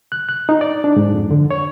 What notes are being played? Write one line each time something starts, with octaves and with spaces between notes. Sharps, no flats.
F#6
F#6
D#4
D5
D4
G#2
F2
D3
C#5